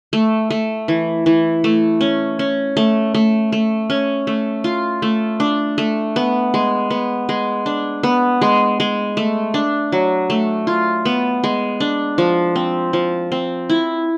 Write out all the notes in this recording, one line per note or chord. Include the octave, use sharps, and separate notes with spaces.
A3
A3
E3
E3
A3
C#4
C#4
A3
A3
A3
C#4
A3
F4
A3
D4
A3
B3
G#3
B3
G#3
D4
B3
G#3
G#3
A3
D4
F#3
A3
F4
B3
G#3
D4
F3
C4
F3
C4
E4